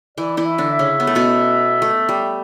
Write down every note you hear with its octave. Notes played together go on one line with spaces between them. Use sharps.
E3 E4 D5
E3 E4
E5
D3 D4
E5
C#3 C#4
B3
A3
B2 B3
A3
G3